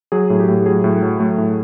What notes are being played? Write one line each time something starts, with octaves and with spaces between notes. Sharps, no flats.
F#3 G#4
A2
G4
A2
F#3 G#4
A2
F#3
A3
A2